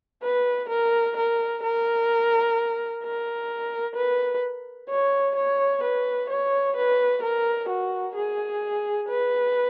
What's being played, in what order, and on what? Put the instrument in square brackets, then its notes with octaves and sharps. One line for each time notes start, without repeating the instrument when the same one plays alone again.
[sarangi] B4
A#4
A#4
A#4
A#4
B4
C#5
C#5
B4
C#5
B4
A#4
F#4
G#4
B4